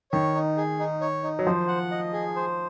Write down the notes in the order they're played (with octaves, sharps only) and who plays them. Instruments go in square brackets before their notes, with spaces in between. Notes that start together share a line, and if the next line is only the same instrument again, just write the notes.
[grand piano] D#3 [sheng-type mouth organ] C#5
[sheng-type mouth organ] D#4
G#4
D#4
C#5
D#4
[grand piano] F#3
[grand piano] F3 [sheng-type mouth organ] C5
[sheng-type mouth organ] F#5
D#5
G#4
C5